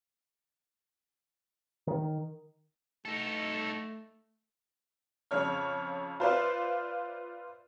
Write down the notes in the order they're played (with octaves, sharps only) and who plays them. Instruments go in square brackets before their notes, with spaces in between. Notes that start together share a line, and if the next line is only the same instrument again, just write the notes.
[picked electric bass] D#3
[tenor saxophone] A3 [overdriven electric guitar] D#4 A4
[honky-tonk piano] F2 C#3 C#5 F6
F4 B4 C5 D5 E5 F5